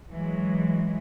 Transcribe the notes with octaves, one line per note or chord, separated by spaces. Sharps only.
E3 F#3 G#3